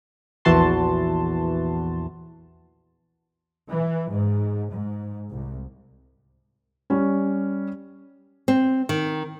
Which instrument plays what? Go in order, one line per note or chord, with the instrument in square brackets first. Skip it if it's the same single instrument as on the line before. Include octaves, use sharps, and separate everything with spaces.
[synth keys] A#1 E2 E3 F#4 A5 C6
[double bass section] E3
G#2
G#2
C2
[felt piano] G3 C#4
[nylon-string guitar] C4
D#3